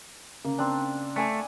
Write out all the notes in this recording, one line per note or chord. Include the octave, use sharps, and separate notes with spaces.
C#3 A#3
C4 D4
A3 D5 G#5 D6